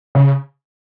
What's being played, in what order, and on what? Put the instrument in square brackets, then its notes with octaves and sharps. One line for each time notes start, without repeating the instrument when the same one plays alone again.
[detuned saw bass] C#3